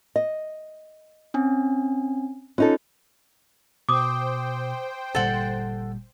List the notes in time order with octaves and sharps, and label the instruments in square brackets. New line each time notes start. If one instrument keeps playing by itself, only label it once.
[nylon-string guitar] D#5
[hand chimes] C4 C#4 G#5
[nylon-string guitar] C#4 D#4 A4 [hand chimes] F4
[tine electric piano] B2 [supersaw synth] C5 G5 [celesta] D6 D#6
[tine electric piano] G1 A#2 G3 [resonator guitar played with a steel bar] A4 F#5